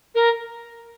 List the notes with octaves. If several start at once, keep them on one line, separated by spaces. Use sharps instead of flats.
A#4